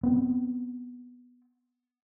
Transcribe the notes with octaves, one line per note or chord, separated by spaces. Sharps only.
B3 C4